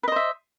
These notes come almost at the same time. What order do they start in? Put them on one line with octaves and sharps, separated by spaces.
B4 D#5 C5 E5